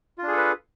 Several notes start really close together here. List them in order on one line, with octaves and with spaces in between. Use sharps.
F4 D4 G#4 A4 B4